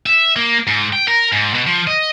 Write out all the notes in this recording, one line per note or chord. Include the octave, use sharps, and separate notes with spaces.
E5
A#3
G#2
G5
A#4
G#2
B2
F3
D#5